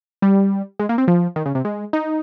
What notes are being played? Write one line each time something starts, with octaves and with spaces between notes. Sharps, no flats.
G3
G#3
A#3
C4
F3
D#3
C#3
C3
G#3
D#4